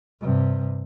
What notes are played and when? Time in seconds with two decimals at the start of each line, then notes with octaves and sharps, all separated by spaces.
0.21 G2 C3